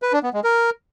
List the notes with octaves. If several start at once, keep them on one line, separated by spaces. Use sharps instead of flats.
B4
D4
B3
G#3
A#4